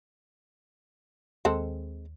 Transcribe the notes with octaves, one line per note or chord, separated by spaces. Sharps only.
D#2 G#3 C4 A4